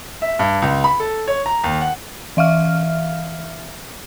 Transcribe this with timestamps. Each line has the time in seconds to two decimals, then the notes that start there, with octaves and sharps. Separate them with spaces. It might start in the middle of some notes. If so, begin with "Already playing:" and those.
0.22 E5
0.39 G2
0.62 C#2
0.84 B5
1.00 A4
1.28 C#5
1.46 A#5
1.64 D#2
1.81 F#5
2.37 E3 E5 F5 F6